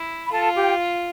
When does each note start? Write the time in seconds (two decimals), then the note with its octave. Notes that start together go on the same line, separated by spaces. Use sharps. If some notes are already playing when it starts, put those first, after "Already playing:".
Already playing: E4
0.27 B5
0.31 F4 A4 A5
0.56 G4 G5